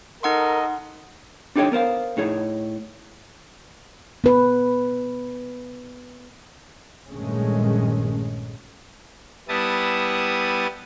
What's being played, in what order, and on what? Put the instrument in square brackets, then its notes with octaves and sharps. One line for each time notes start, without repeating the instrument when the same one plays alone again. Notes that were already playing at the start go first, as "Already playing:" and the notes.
[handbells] D#4 F#5 C6 [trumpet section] A4 D#5 [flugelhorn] A#4
[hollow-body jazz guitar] D4 D#4 G4 A4 C#5 G5
B3 A#4 C5 F5
A2 D#4 G#4 C#5
[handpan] B3 B4
[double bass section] A#1 G2 D#3 G#3 A3 C#4
[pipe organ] G3 B3 E4 A5 D#6